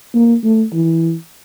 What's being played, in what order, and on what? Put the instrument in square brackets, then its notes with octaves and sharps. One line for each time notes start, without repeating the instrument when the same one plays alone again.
[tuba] A#3
A3
E3